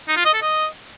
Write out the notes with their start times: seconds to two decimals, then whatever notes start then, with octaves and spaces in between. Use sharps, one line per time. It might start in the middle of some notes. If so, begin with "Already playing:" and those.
0.08 D#4
0.17 F4
0.25 D#5
0.34 A4
0.42 D#5